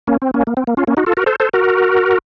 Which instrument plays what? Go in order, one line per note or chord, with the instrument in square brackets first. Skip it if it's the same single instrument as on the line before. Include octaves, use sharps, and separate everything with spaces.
[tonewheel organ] A#3 C#4
C4
A#3 C#4
A#3
C4
A#3
C#4 F4
A#3 C#4
D#4 F#4
F4 A4
F#4 A#4
A4 C5
A4 C5
F#4 A#4